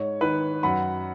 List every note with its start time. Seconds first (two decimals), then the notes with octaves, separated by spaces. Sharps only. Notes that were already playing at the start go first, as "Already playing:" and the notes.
Already playing: G#2 C#5
0.21 D#3 B4
0.63 F#2 F#5 B5